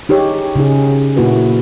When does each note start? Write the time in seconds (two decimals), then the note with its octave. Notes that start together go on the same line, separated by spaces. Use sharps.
0.09 D#4 G4 G#4 C#5
0.56 C#3 D#4 G#4
1.17 A#2 A#3 E4 F#4 B4